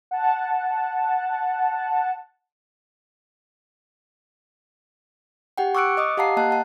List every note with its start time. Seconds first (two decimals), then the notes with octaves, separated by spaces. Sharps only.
0.11 F#5 A5
5.58 G4 F#5 G5
5.75 C#6 D6 E6 F#6 C#7 D7
5.97 D#5 D6 D#6
6.17 G4 F5 F#5 A5 A#5 C7
6.37 A#3 D#5 A5 F#6
6.51 F#5 A5